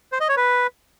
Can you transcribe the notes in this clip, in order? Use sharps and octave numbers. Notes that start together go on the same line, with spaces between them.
C5
D#5
C#5
B4